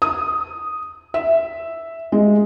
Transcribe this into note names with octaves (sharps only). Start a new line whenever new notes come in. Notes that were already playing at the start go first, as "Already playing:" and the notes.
D#6
E5
G#3